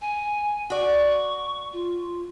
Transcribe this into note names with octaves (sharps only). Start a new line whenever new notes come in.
G#5
F#4 D5 C#6
F4